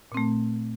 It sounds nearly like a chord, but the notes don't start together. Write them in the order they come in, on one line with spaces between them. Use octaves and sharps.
A#2 C4 A3